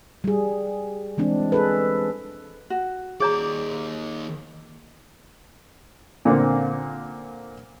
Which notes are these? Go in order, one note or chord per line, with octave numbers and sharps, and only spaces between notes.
G3 G#4
E3 G#3 C4 D4
G#4 A4 B4
F#4
D#2 G#4 C#5 D5 A#5
A#2 D3 A#3 C4